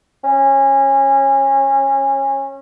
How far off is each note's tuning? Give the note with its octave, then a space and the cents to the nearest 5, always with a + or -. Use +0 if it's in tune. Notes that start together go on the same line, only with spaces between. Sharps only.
C#4 -25